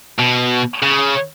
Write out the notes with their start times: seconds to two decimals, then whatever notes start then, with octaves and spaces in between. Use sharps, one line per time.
0.19 B2
0.82 C#3